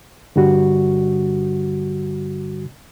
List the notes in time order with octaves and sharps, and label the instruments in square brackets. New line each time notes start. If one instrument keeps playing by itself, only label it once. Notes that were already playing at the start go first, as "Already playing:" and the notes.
[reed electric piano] G2 D3 G3 F#4